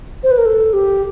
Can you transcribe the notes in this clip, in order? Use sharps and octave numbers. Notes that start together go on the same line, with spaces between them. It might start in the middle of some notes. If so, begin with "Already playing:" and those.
C5
B4
A#4
A4
G4